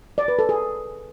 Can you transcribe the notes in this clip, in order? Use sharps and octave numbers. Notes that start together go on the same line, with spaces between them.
D5
B4
A4
G#4